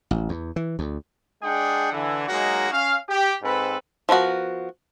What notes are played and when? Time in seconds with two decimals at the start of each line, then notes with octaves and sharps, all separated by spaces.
0.11 A1
0.29 E2
0.56 E3
0.79 D2
1.43 G#3 D4 G#4 F#5 G5
1.93 D3 E3
2.29 F#3 G#3 A#3 D#4 F#4
2.72 C#4 F5
3.09 G4
3.42 G#2 C4 A4 B4
4.09 F3 B3 F4 F#4 A#4